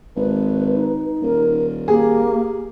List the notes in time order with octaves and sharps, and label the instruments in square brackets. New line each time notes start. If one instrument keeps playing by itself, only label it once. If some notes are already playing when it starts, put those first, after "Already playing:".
[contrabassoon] G#1 [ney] B4
[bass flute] D#4
[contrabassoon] D#1 [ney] A#4
[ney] A#3 [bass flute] G4 [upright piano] G#4